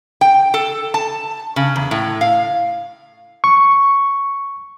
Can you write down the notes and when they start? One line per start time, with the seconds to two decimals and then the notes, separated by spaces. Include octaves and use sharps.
0.21 G5
0.54 A4
0.94 A5
1.56 C#3
1.76 E2
1.91 A2
2.21 F5
3.44 C#6